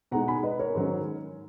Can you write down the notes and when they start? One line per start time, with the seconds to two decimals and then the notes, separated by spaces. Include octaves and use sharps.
0.11 B2 G#3 D#4 F#5 A#5
0.28 G#5 B5
0.43 B4 D#5
0.59 A#4 C#5
0.75 G#2 D#3 F#3 C#4